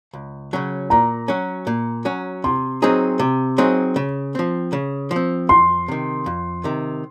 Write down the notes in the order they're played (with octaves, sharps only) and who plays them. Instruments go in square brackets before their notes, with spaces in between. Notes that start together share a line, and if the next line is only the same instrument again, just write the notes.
[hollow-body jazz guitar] C#2
C#3 F#3 C#4
[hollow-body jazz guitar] A#2 [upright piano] A#5
[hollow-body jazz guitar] F#3 C#4
A#2
F#3 C#4
[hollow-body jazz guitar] C3 [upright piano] C6
[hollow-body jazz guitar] F#3 C4 D#4 G#4
C3
F#3 C4 D#4 G#4
C#3
F3 C4
C#3
F3
C4
[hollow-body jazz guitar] F2 [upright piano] C6
[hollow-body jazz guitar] C3 D#3
F2
C3 D#3